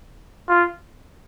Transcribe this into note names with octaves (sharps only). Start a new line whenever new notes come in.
F4